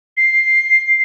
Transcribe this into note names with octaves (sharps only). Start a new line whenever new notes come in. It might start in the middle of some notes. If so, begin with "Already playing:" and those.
C7